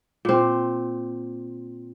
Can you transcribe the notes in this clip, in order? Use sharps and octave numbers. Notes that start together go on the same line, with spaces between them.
A#2 C4